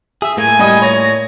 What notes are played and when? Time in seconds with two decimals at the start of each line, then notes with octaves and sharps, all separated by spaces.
0.22 G#4 E5
0.37 A2 A3 A#3 G#5
0.59 G3 D#5 D#6
0.82 C#5 A#6